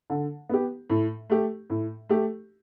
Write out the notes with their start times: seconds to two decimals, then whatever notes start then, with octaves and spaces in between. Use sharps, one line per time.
0.10 D3
0.49 B3 G4
0.90 A2
1.30 A3 G4
1.70 A2
2.09 A3 G4